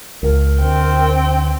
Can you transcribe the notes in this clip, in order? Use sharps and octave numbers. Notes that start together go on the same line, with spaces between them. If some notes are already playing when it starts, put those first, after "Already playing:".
C#2 A#4
D2 C4 G5